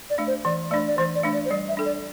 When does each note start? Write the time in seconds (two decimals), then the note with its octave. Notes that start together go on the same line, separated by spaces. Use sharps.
0.10 D5
0.18 A3 D4
0.27 C5
0.45 E3 D5
0.71 A3 D4 D5
0.88 D5
0.98 E3 C5
1.15 D5
1.24 A3 D4
1.33 D5
1.45 C5
1.50 G3 D5
1.68 E5
1.77 D4 A4
1.85 D5